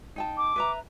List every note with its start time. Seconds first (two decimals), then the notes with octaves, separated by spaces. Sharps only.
0.16 D#4 G5 A5
0.37 D6
0.56 B4 E5 A#5